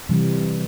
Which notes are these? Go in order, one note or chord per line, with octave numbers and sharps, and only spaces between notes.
C3 E3 G3